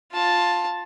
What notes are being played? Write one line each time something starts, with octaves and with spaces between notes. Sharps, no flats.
F4 A5